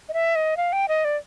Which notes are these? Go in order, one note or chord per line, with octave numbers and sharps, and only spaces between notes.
D#5
E5
D#5
F5
G5
D#5
D5